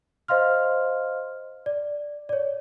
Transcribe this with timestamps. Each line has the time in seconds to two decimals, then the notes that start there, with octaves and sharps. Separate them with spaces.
0.28 C5 D#5 F5 C6 F6
1.66 D5
2.29 C#5 D5